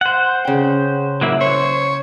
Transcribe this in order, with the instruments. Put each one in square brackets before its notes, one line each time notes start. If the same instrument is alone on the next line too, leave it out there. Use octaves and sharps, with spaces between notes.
[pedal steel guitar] C5 F#5
[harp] C#3 G5
[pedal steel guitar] F#3 A#3 E4
[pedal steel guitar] C5 [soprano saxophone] C#5